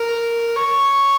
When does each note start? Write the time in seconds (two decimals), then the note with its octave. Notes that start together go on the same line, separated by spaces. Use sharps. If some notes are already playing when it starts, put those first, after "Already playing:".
Already playing: A#4
0.56 C#5